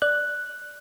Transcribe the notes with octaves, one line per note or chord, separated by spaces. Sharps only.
D5 F#6